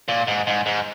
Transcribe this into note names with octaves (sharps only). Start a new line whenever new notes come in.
A#2
G#2
G#2
G#2